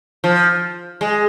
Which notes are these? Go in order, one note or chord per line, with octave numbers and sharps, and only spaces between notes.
F3
G#3